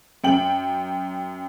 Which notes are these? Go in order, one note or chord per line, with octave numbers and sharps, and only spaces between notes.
F#2 G5 F#7